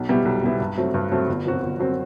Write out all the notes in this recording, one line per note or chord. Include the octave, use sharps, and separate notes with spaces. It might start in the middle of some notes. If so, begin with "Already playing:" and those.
Already playing: B1
B2 G3 B3 E4
B1
B2 G3 B3 E4
G2
F#3 A3 C4
G2
F#3 A3 C4
G1
F#2 F#3 C4 F#4
G1
F#2 F#3 C4 F#4